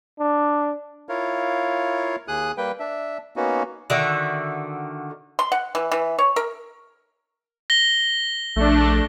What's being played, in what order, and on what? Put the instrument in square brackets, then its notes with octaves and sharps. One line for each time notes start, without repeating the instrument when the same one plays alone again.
[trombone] D4
[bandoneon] E4 F4 A#4 C#5 F5
D#2 G#4 D#6 F#6
G3 A#3 B4 G5
D4 E5
A#3 B3 C#4 D#4 F#4
[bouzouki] D3 D#3 F#4 E5
[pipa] C6
F#5
E3
E3
C#5
A#4
[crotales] A#6 G7
[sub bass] A#1 [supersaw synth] A3 D4